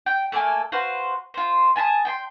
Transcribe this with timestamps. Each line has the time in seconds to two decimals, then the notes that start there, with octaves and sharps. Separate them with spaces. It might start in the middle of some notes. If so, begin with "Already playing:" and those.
0.06 G5
0.32 A3 A#3 A4 G#5
0.72 F#4 B4 C5 F5
1.34 F4 C5
1.76 G#5 A5 B5 D#6
2.05 G5 G#5 C6